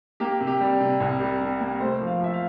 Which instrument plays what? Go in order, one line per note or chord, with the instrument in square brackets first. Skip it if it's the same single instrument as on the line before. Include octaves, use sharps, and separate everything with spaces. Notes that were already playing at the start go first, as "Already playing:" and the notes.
[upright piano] A#3 G4
C3
G4
G3
C3
C2
G3
C3
A#3
A3 C5
F3
F5
F3 E5
F5